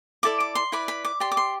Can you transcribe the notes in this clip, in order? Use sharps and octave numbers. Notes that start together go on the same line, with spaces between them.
E4 A4 D5 D6
D6
C6
E4 B4 D5 B5
B5
D6
G4 D5 C6
D6
C6